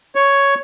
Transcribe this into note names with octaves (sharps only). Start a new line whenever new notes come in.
C#5